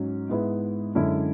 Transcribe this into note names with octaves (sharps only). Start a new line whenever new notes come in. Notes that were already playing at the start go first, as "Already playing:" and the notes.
Already playing: G#2 F#3 C#4
G#2 G#3 B3 E4
F#2 D3 G#3 C#4 E4